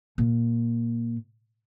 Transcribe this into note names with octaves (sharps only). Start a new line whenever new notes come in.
A#2